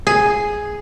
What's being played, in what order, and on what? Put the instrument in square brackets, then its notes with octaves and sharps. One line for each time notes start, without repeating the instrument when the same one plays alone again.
[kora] G#4